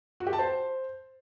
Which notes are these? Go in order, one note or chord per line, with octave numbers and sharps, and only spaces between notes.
F#4
G4
A5
C5